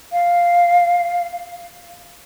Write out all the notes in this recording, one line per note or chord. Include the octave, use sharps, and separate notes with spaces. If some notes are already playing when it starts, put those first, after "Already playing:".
F5